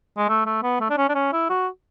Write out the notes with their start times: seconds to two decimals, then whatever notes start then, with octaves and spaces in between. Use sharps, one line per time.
0.17 G#3
0.29 A3
0.46 A3
0.63 B3
0.80 A3
0.90 D4
0.97 C#4
1.09 D4
1.14 C#4
1.32 E4
1.49 F#4